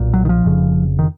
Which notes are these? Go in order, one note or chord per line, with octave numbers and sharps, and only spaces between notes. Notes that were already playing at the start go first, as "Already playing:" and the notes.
Already playing: B1 A#2
F#3
D#3
F3
F1 F2 C#3
D#3